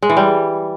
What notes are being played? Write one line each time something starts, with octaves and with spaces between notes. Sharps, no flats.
G#3
E3
G3